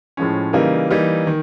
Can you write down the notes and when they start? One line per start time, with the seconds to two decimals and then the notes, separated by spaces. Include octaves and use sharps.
0.17 A2 F3 G#3 C#4
0.53 C#3 E3 G3 A#3 D#4
0.90 E3 G3 A#3 D#4
1.27 D#3